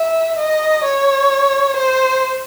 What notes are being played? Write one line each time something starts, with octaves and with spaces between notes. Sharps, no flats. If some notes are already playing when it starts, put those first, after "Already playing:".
Already playing: E5
D#5
C#5
C5